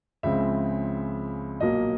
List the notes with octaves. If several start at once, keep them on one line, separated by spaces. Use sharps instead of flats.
C#2 C#3 F3 G#3 C4 E5
B1 A#2 F#3 A#3 D#5